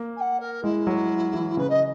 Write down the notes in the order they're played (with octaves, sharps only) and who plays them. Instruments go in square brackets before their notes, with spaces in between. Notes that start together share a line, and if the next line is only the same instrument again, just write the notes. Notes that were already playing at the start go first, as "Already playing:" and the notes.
Already playing: [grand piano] A#3
[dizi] G#5
F#5
A#4
[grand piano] G#3 [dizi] E4
[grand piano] F#3
E3
[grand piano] C#3 [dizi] B4
[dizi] D#5